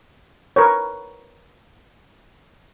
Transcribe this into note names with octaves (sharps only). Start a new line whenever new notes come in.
A#4 B4 C#5